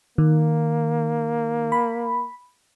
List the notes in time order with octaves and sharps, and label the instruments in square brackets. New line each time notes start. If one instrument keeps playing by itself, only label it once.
[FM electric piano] D#3 [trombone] A#3
[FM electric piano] B5